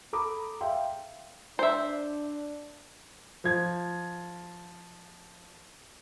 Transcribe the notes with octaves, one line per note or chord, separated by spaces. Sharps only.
A4 A#5 B5 D6 D#6
E5 F5 G5 C6
D4 C5 E5
F3 G#6